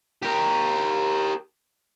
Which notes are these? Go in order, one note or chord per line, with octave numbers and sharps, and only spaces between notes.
G4 A#4